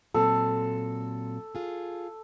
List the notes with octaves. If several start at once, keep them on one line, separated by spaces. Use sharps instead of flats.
A#2 F#3 C4 A4
F4 G#4